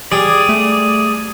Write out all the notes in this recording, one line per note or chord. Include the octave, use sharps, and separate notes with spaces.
G3 G#4 D5
A3